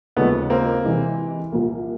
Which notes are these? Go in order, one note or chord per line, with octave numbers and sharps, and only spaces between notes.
D#2 C#3 F3 G#3 A3 B3
A#3 C4
C3 E3 G#3
C2 A#2 F3 A#3